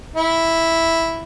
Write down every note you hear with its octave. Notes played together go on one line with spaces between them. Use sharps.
E4